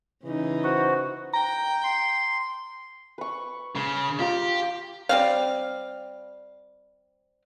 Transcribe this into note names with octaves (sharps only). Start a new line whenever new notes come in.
C#3 E3 D#4
F#4 C5
G5 A#5
C6
B4 C#6
C#3 C6
F4 G4 A#5
G3 C4 F5